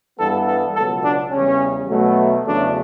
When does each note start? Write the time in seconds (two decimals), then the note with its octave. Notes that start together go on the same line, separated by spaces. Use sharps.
0.19 G2 E3 G3 B3 A4
0.48 A4
0.75 C#2 B2 F#3 B3 A4
1.03 D4
1.32 E2 C#3 G3 C#4
1.89 B2 F#3 A3
2.45 E2 C#3 F#3 A3 D4